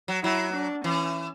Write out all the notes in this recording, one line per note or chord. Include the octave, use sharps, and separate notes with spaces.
F#3
F#3 E4
D4
E3 C#4